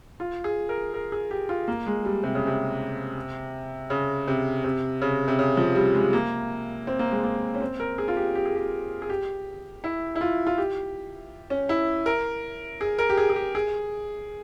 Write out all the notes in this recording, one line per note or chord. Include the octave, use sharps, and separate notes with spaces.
F4
G#4
A#4
A#4
G#4
G4
F4
A#3
G#3
G3
C3
C#3
C3
C#3
C3
C3
C#3
C3
C#3
F3
G3
G#3
A#3
C4
A#3
G#3
A#3
C#4
C4
A#4
G#4
F4
G4
G4
G#4
G4
G#4
G4
E4
E4
F4
F4
G4
C#4
E4
A#4
G#4
A#4
G4
G#4
G#4
G4
G#4